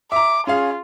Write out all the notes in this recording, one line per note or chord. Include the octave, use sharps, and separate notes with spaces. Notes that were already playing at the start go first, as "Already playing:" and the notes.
E5 A#5 D6
C#4 F4 G#4 F5